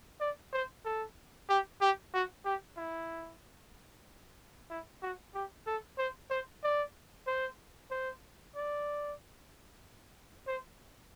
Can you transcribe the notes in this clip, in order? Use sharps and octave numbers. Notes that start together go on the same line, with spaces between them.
D5
C5
A4
G4
G4
F#4
G4
E4
E4
F#4
G4
A4
C5
C5
D5
C5
C5
D5
C5